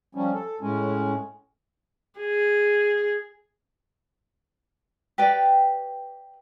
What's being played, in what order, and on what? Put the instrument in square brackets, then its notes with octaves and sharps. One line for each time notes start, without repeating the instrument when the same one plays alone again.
[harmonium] F3 G3 C#4
A4
A2 G#3 C#4
[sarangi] G#4
[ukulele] G4 B4 D5 G5